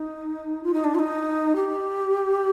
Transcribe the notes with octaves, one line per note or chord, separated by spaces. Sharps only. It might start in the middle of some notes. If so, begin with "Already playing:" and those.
Already playing: D#4
F4
D#4
D4
F4
D#4
G4